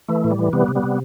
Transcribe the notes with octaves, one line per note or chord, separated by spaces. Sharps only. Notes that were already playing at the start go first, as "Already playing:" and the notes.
E3 A3
A2
G3
E3
C3 G3 B3
C3
G3 B3
C3